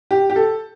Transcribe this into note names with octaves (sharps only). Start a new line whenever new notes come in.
G4
G4
A4